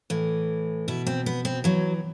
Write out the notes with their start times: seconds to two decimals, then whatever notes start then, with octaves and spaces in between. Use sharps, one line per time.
0.10 A2 E3
0.88 B2 E4
1.07 C4
1.26 B3
1.45 C4
1.64 E3 F#3